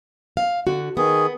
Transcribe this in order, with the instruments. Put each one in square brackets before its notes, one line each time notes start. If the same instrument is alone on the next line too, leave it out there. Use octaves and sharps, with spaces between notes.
[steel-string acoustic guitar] F5
D3 F#4
[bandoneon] D#3 G#4 [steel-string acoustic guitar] B3